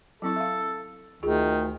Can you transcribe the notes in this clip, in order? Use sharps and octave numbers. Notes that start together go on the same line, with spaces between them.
F#3 C4 E4 A4
E5 F5
D2 D#3 F4 G#4